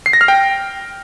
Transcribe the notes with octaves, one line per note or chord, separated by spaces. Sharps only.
C7
A#6
F6
G5